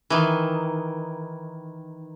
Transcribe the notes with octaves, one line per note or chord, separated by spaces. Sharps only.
D#3 E3